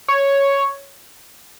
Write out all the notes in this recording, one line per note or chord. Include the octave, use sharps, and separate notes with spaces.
C#5